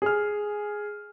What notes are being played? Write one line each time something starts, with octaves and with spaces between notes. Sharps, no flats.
G#4 F6